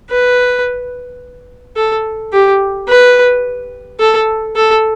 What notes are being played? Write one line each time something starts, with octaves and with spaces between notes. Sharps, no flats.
B4
A4
G4
B4
A4
A4